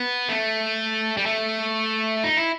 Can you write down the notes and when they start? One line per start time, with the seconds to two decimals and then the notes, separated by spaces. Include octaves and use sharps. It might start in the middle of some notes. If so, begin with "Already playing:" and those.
Already playing: B3
0.29 A3
1.17 G3
1.26 A3
2.24 D#4
2.37 E4